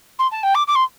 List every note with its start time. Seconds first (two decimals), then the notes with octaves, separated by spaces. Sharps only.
0.19 C6
0.31 A5
0.43 G5
0.55 D6
0.68 D6
0.75 C6